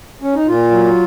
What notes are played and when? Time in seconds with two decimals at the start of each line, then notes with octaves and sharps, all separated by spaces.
0.22 C#4
0.35 D#4
0.48 A#2 F4
0.71 F#3